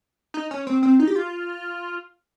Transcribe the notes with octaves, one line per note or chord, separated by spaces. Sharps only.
D#4
C#4
C4
C4
D#4
G4
F4